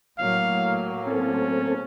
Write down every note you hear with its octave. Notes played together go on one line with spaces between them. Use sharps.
A2 F#3 A#3 F5
C4 C#4 A4